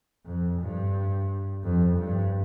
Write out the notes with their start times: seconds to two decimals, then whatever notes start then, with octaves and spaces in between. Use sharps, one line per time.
0.26 F2
0.60 G2
1.64 F2
1.98 G2